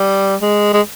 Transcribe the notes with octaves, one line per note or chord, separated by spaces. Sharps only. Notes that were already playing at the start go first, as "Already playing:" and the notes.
Already playing: G3
G#3
G#3